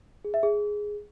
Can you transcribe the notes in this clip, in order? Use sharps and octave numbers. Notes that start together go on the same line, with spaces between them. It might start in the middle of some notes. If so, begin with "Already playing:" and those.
G#4
E5
G#4